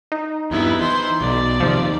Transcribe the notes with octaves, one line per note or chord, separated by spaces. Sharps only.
D#4
E2 G2 B3 E4
E3 C5
B1 D5
D#2 C3 F3